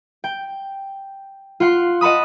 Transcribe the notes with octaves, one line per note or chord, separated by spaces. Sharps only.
G5
F4 F#5 C6
D#5 F#5 A5 B5 D#6